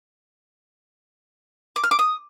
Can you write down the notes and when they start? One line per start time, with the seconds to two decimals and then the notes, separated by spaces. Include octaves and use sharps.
1.76 D6
1.84 F6
1.91 D6
1.99 D#6